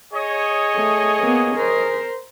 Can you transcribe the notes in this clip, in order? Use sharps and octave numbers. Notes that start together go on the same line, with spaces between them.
G#4 C#5 D#5
A3
A#3 B3
A#4 C5